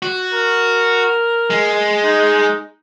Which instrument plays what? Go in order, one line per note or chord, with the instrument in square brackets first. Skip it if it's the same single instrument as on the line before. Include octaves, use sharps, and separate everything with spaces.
[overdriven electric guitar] F#4
[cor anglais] A#4
[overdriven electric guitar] G#3
[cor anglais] D#4